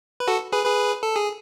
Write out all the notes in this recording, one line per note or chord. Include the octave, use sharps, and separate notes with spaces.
B4
F#4 A4
G#4 B4
G#4 B4
A4
G#4